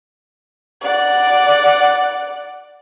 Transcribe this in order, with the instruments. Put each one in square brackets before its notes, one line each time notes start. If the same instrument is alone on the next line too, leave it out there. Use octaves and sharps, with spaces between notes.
[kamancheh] D5 F#5